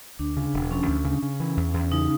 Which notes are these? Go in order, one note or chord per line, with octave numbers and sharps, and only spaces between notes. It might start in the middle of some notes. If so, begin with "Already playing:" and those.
D2 D4
C#3
E1
F3 C#4
D2
C#3
C#3
E3
E2
E2
C#3 D#4